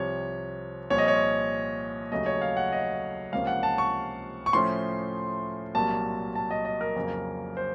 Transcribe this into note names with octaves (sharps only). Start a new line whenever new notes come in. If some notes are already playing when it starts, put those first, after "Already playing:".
Already playing: C2 C3 F3 C#5
C2 A#2 F3 C#5
D#5
C#5
D#2 C#3 F#3 A3 D#5
C#5
F5
F#5
D#5
C#2 C3 F3 A#3 C#4 F5
F#5
A5
C#6
C#6
A2 F3 A3 C#4 C6
C2 A#2 F#3 A#3 A5
A5
D#5
D#5
A#4
F2 C#3 F#3 A#3
C5